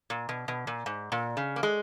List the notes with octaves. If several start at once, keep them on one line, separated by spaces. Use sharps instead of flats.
A#2
B2
B2
A#2
G#2
A#2
C#3
A#3
G#3